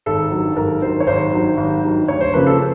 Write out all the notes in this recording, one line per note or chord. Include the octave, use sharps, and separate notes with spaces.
G#1 A4
G2 D#3 F#3
G#1 A#4
G2 D#3 F#3 C5
C#5
G#1 C5
G2 D#3 F#3
G#1
G2 D#3 F#3
D2 C#5
C5
C#3 F3 A#3 B4
A4